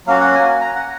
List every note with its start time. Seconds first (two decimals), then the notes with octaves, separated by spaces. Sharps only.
0.07 F#3 A#3 C#4 F#4 F5
0.21 F#5
0.35 G#5
0.61 A#5
0.76 F#5